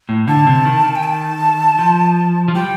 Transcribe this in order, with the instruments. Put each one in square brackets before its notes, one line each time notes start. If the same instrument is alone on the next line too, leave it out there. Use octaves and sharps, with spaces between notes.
[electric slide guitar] A2
[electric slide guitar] D3 [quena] A5
[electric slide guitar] C3
D#3
D#3
[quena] G5
A5
[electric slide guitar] F3
F3
[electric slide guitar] G3 [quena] G5